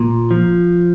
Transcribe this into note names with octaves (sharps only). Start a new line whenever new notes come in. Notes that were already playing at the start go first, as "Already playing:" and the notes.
Already playing: A#2
F3